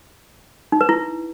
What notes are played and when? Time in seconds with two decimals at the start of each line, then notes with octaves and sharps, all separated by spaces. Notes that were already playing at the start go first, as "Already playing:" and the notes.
0.72 D#4
0.81 B4
0.89 E4